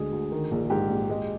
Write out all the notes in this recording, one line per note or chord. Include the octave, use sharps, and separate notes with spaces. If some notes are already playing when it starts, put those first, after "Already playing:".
Already playing: D2 D3 G#3 G#4
D2
D#3
A#1
G#2 G4
A#1
G#3